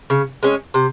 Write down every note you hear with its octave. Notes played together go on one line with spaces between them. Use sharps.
C#3
G#3 C#4
C3